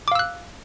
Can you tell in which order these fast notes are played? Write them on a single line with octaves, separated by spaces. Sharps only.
D6 F5 E6 F#6